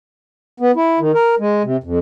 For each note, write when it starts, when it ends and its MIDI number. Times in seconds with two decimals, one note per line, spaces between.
0.60 0.71 59
0.76 0.99 64
1.00 1.12 51
1.14 1.35 70
1.40 1.62 56
1.64 1.77 48
1.84 1.99 41